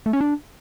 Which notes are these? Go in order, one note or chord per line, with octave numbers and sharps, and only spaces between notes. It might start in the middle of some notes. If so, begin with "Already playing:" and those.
A3
C#4
D4